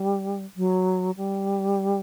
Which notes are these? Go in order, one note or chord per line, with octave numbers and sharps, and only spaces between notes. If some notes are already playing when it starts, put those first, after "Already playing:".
Already playing: G3
F#3
G3